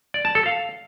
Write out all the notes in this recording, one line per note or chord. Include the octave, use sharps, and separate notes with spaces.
D5
A5
A4
F5